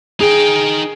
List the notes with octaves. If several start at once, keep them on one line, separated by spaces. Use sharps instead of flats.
D#4 G#4 G5